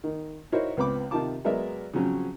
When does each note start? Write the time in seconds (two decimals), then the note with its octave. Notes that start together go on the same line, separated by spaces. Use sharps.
0.04 D#3
0.52 D#4 E4 F#4 A#4 C5 C#5
0.77 C#2 B3 C4 B5 D6
1.11 C3 D#3 F4 G4 A5 D6
1.44 F#3 G#3 B3 A#4 D5 E5
1.94 C#3 F3 F#3 C4 C#4